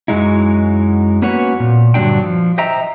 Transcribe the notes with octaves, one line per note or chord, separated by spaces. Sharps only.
F#2 F#3 G#3 D#4 E4
A#3 B3 C#4 F#4 C#5
A#2
G2 D3 F#3 B3 D4 G5
F3
C5 D#5 E5 G5 A#5